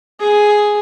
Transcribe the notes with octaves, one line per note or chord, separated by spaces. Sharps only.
G#4